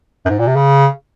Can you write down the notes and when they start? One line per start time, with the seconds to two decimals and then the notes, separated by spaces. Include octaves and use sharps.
0.25 F#2
0.30 G#2
0.39 A#2
0.47 C3
0.56 C#3